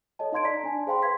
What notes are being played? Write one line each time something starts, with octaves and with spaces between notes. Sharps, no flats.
A4 C#5 D#5 A5
D#4 F5 C6 G#6 D7
D5 A#5 B6
D4 G#5 A5
G#4 C5 F5 G5 B5 C6
B4 F5 C6 G#6 B6